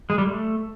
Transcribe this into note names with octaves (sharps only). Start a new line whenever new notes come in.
G#3
G3
A3